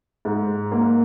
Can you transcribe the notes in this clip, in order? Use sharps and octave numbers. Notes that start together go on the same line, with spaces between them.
G#2
A#3